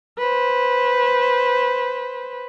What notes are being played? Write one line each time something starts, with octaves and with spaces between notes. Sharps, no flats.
B4 C5